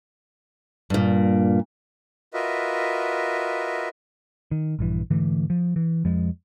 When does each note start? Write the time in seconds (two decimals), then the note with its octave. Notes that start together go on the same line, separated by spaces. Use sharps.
0.90 G2 A#2
2.34 F4 F#4 A#4 B4 D#5 E5
4.51 D#3
4.79 A#1 G2 E3
5.10 G#2 D3 E3 A3
5.50 F3
5.76 E3
6.04 F2 F3 G#3